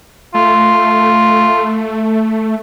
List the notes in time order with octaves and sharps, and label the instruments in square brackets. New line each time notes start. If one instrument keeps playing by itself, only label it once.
[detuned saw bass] A3 [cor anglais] F4